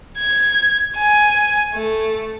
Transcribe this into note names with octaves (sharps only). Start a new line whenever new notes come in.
G#6
G#5
A3